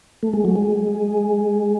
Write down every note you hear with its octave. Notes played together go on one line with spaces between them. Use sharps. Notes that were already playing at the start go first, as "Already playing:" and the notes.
A3
G#3
F#3
G#3